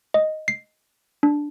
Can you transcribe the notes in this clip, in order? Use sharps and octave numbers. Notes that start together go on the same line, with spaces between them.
D#5
C7
D4